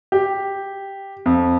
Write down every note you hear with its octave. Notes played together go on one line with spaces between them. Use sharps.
G4
F2